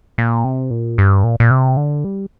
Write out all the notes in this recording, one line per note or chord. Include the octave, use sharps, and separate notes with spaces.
A#2
C3
A#2
G2
A#2
A#2
C3
D3
G3